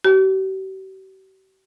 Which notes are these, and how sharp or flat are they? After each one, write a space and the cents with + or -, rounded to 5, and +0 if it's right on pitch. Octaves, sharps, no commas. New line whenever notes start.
G4 -45